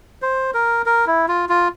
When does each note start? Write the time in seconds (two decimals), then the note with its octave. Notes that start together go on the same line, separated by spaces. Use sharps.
0.22 C5
0.54 A#4
0.86 A#4
1.07 E4
1.28 F4
1.49 F4